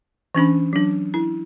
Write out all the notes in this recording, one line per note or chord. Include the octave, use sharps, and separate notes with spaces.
E3 C#4 D4 B5
F#3 D4
E4